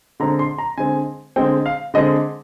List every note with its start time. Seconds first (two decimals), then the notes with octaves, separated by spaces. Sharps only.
0.20 D3 G#3 C4 A#5
0.39 C6
0.58 A#5
0.78 D3 G#3 C4 G#5
1.36 D3 G#3 C4 G5
1.66 F5
1.94 D3 G#3 C4 D#5